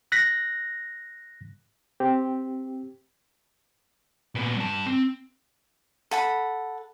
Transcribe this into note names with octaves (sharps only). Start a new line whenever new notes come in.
F#6 A#6 B6
C4 G4
A#2 B3
G2 A5
C4
A4 F#5 B5